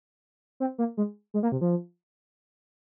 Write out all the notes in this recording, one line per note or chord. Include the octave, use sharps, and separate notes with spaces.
C4
A#3
G#3
G#3
A#3
C3
F3